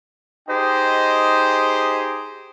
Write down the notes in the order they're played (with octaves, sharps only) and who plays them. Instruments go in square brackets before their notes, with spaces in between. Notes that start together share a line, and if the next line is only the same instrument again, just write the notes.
[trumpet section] D#4 G4 G#4 C5 D#5 G5